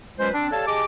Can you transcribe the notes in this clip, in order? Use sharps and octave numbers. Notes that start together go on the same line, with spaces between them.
F#3 G#3 C#4 F4 B4 C5
C4 D4
G4 A4 C#5 D5 F5 A5
G4 G#4 D#5 A5 D6